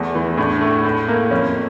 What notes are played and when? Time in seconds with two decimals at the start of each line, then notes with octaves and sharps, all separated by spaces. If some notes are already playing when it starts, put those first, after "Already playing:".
Already playing: E2 A3
0.15 E3
0.37 A2 D4
0.61 A3
0.85 A2
1.08 A#3
1.31 F2 C#4